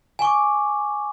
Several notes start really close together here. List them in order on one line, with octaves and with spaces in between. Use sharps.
G#5 C#6 D6